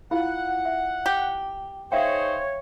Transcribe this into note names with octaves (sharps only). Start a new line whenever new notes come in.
E4 F4 F5 F#5
E5
G4
D#4 G#4 C5 C#5 E5 F5 G5